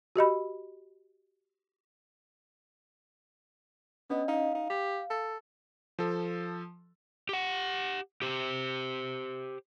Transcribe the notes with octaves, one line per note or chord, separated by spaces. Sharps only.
F#4 G4 D#5 B5
B3 C#4 D4 D#5
D#4 F5
D#4
G4
A4
F3 A4
G4 F#5
G4 C5